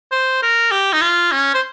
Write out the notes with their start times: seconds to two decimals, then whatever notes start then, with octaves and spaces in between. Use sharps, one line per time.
0.12 C5
0.43 A#4
0.71 G4
0.93 D#4
1.01 F4
1.32 C#4
1.54 C5